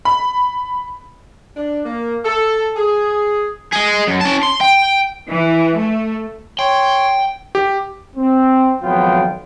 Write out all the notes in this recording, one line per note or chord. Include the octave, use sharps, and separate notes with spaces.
B5
D4
A#3
A4
G#4
G#4 D#5
F#2
C#4 A5
C6
G5
E3
A3
C#5 G5 C6
G4
C4
G#1 F2 F#3 B3 F4 G5